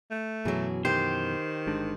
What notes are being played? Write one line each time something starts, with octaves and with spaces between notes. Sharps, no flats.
A3
F#2 B2 E3 F#3 G#4
D#3 G4 C5
G1 G#3 D4